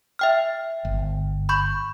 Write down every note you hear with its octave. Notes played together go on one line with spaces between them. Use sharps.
E5 G5 F6
G1
B5 C#6 G6